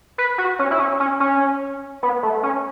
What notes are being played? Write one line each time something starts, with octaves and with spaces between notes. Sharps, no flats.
B4
F#4
C#4
E4
C#4
C#4
C#4
B3
A3
C#4